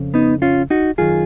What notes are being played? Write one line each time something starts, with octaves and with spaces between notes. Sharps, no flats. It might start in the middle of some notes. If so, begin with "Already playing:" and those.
Already playing: F2 C#3
B3 D#4
C#4 F4
D#4 F#4
F#2 D#3 F4 G#4